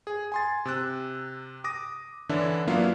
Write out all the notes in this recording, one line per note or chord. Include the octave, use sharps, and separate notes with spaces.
G#4
G#5 C6 A6
C3 E6 F#6
D6 D#6 A#6
D3 E3 C#4 D4 E4
F#3 A#3 B3 D4 E4 F4